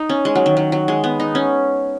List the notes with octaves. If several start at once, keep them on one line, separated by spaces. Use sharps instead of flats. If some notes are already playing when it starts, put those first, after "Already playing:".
Already playing: D#4
C#4
G#3
F#3
D#3
F#3
F#3
G#3
B3
D#4
C#4